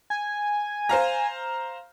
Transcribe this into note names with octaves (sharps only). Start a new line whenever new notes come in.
G#5
C5 F5 A#5